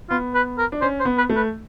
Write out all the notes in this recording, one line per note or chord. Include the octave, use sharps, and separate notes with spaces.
B3 F4
B4
A#4
D4
C#4 C5
C5
B3
B4
A3
B4